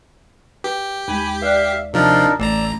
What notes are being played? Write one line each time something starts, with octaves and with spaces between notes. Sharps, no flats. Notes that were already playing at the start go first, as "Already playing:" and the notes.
G4 B4
D#2 G#3 G#5 B5
B4 D5 E5 F5 F#6
C3 F3 D4 D#4 A#4
A1 A3 D5 A#5 E6